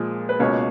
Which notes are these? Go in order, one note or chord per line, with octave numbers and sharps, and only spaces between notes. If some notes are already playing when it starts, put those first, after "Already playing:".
Already playing: A#2 F3 G#3
B4
C#2 B2 A#3 C#5